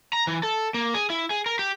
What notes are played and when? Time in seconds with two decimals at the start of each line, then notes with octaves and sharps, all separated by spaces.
0.13 A#5
0.27 E3
0.43 A4
0.74 A#3
0.94 G#4
1.10 E4
1.30 G#4
1.46 A#4
1.59 G4